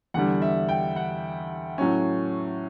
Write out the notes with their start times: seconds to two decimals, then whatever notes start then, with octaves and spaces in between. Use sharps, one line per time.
0.14 E2 D3 G3 F#5
0.42 E5
0.69 G5
0.96 F#5
1.78 A2 F#3 C#4